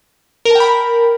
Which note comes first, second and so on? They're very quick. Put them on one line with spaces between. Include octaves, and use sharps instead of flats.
A#4 A5 G5 B5